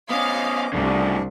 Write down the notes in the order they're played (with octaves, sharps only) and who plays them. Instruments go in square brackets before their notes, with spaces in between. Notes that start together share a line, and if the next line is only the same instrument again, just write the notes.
[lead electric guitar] B3 C#4 [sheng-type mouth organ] D#5 D6 [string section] F5
[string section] C2 [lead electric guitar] C#3 A3 [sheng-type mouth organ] D4